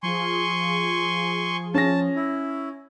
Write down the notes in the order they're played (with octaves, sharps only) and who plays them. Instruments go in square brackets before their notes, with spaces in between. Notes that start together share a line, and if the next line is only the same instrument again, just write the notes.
[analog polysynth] F3 F4 G#4 [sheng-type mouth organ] G#5 C6 C#6
[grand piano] C#4 A#6 [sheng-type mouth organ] A5
[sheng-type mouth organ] E4